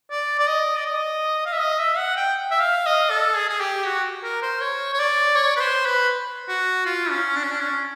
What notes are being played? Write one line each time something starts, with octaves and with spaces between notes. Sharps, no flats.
D5
D5
D#5
D5
D#5
F5
E5
D#5
E5
F#5
G5
E5
F5
D#5
A4
G#4
G#4
G4
F#4
A#4
C5
C#5
C#5
D5
C#5
B4
C5
B4
F#4
F4
C#4
D4
C#4
D4
C#4